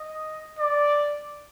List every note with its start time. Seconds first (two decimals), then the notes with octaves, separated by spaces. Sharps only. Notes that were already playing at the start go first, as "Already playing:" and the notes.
Already playing: D#5
0.59 D5